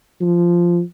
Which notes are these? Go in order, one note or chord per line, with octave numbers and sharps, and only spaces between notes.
F3